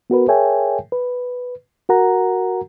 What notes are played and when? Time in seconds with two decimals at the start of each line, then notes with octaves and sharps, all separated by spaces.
0.10 B3 F#4 A#4 B4
0.28 G#4 A#4 C#5 E5 G5 G#5
0.92 B4
1.89 F#4 A#4 F#5 A#5